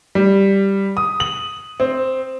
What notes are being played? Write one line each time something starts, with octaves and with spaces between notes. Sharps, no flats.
G3
D#6
F#7
C4